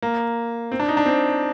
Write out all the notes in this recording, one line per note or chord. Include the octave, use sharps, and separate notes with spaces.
A#3
C4
D4
D#4
D4
C4